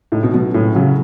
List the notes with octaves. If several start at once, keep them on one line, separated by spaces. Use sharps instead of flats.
A2 D#4
B2
B2 F#3
A2 C#4
C#3 F#3